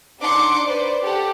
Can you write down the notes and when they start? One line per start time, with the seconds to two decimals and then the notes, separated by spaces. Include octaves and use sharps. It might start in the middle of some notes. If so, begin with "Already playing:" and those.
0.21 D4 D#4 F#5 C6 D6 C#7
0.65 B4 C5 D5
1.01 G4 A4 F#5